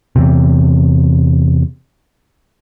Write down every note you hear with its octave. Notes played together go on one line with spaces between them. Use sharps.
E2 C3